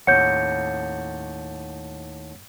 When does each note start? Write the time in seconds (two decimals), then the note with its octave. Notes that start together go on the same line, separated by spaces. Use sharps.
0.07 D#2 A2 C#5 F#5 G6 C#7